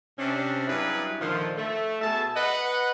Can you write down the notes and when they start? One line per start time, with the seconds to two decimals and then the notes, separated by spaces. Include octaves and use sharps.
0.18 C3 C#4 D4
0.67 G2 F#3 D4 E4 G#4 B4
1.21 A#2 D3 D#3 F3
1.57 A3
2.01 B2 G#4 E5 A5
2.36 B4 D#5 F#5